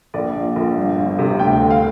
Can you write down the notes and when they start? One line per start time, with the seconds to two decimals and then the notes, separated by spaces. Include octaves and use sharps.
0.14 A#1 D5
0.35 A#2
0.56 A#1
0.77 G1
0.98 G1
1.19 C3
1.39 D2 G5
1.60 D3
1.70 F5